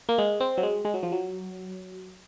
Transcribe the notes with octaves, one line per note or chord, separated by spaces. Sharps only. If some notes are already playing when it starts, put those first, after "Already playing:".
A#3
G#3
C4
F#3
G#3
G#3
F#3
F3
F#3